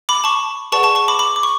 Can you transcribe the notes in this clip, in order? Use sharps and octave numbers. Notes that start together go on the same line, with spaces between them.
B5 D6
A5 C#6
G#4 B4 D5 F#5 A5 C#6
A5 C#6
A5 C#6
B5 D6
B5 D6
D6
C#6